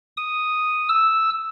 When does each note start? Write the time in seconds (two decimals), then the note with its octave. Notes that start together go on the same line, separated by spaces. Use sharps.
0.17 D#6
0.89 E6